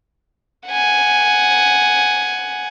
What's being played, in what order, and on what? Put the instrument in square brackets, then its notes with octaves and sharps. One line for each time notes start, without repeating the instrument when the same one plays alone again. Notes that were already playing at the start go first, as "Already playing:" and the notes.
[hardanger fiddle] F#5 G#5